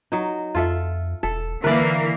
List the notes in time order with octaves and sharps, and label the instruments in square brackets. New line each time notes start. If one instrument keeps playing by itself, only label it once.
[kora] F#3 D#4
[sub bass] F2 [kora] F4 A4 E5
[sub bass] E1 [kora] A4
[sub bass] D3 [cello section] E3 A#3 [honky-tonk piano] A#4 E5 [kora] B4 D5